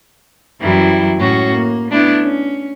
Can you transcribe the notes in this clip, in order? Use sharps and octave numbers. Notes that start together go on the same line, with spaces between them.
F#2 E3 F#3 G3 E4
A2 G#3 C#4 F#4
A#3
A3 B3 D4 E4
C#4